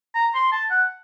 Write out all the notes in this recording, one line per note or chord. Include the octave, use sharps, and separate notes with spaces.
A#5
C6
A5
F#5